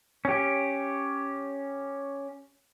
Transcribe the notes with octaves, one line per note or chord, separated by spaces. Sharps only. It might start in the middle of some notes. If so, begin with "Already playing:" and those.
C#4 G4